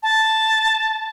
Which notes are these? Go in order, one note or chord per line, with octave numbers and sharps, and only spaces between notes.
A5